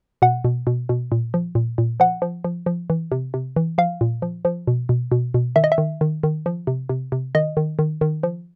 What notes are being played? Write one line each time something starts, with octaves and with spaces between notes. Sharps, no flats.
B2 F#5
B2
B2
B2
A#2
F3
A#2
A#2
F3 F#5
F3
F3
F3
E3
C3
C3
E3
F3 F5
A#2
F3
F3
B2
B2
B2
B2
D#3 E5
D#5
E5
D#3
D#3
D#3
F3
C3
C3
C3
D#3 D#5
D#3
D#3
D#3
F3